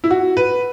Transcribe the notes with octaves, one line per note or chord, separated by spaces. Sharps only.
E4
F#4
B4